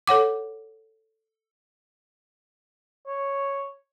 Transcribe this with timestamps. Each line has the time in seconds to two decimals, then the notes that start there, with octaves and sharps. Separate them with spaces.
0.07 A4 C#5 F#5 D6
3.07 C#5